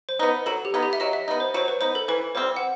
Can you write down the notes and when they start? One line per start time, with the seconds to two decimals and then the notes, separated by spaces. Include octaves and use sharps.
0.09 C5
0.19 B3 D#4 B4
0.46 F#3 A4
0.65 G4
0.74 B3 D#4
0.83 G4
0.93 E5
1.00 F#3 D#5
1.13 E5
1.28 B3 D#4 D#5
1.40 C5
1.54 F#3 C5
1.68 B4
1.81 B3 D#4 C5
1.95 A4
2.08 E3 B4
2.35 G3 C4 C5
2.56 F#5